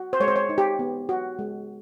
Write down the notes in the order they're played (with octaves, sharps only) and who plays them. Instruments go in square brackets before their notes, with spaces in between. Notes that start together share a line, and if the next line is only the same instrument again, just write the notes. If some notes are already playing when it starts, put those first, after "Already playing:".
Already playing: [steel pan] F#4
C5
G#3 C#5
C5
C#5
D#4
G4
B3
F#4
G#3